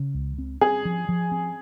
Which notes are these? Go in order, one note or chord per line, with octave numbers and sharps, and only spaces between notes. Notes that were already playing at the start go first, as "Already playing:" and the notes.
Already playing: C#3
C#2
C4
C4 G#4
F3
F3
C4